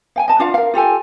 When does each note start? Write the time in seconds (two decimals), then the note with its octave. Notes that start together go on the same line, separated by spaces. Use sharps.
0.16 F5 G5 G#5
0.28 D#5 A5
0.39 D4 F4 F5 F#5
0.54 A#4 F5
0.74 F4 G4 A4 G#5